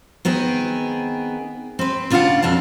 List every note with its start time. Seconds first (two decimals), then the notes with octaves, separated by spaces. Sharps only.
0.25 D#3 B3 C4 G#4
1.79 C4 B4
2.10 C#3 D4 F4 F#4 F5 F#5
2.43 F2 B2 D4 A5